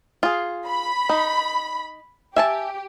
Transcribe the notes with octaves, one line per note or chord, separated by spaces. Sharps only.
F4 G#4
B5
D#4
G4 E5 G#5 A5